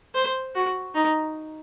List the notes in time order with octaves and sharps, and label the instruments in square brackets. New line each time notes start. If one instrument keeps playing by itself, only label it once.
[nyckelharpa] C5
F#4
D#4